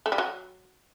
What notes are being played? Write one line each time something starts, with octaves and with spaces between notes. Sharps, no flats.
A3
G3
F#3